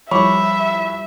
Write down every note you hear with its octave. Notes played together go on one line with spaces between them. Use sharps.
F3 G3 E4 C#5 E5 B5 C#6 D6